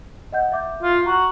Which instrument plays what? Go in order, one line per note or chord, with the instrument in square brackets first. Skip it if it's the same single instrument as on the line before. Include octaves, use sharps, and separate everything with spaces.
[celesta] D#5 F#5 G6
E5 D6 G6
[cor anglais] F4
[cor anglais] F#4 [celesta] A#5